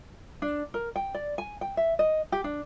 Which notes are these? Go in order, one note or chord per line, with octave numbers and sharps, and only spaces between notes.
D4
A#4
G5
D5
G#5
G5
E5
D#5
G4
D4